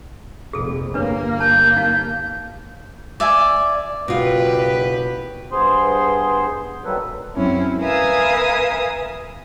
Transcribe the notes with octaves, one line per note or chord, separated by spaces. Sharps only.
F1 A#1 G#4 A4
G1 A#3 D4 B4 C#5
A5 G6
D#4 F5
D5 E5 G#5
F#1 B2 F4 G4 B4
G2 B3 G#4 C5 C6
D#3 F#3 G3 A#3 A4 B4
F#2 F#3 G#3 C4 C#4 E4
A#4 B4 E5 F5 G#5 D#6